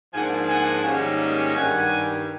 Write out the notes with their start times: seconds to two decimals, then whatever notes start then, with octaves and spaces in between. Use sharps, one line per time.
0.13 G#2 F3 A#3 D4 F4 F#5 G#5
0.48 F#5 G#5
0.84 G#2 D#3 G3 A#3 C#4
1.54 G2 D#3 G3 F#5 G#5